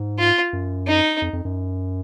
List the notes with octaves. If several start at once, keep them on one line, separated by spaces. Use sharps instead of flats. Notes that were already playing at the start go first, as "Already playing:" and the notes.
Already playing: G#2
F4
F#2
D#4
F2
F2
F#2